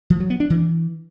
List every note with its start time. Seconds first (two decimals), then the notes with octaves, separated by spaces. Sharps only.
0.10 F3
0.20 F#3
0.30 B3
0.40 D4
0.50 E3